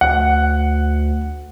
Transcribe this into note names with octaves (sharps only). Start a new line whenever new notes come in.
D2 F#5